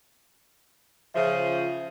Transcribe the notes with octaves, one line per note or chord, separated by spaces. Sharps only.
C#3 F3 E5